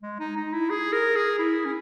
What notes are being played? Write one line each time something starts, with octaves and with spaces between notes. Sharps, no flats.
G#3
D#4
D#4
E4
G#4
A#4
G#4
E4
C#4